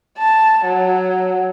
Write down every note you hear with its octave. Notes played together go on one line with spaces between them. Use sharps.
A5
F#3